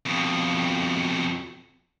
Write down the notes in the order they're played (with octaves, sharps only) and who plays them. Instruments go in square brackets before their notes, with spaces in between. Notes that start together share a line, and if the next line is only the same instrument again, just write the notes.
[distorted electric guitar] F2 B2